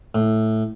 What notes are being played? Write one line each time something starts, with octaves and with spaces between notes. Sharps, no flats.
A2